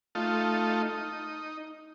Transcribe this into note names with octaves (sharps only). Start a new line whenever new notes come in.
A3 D#4 F4
D#4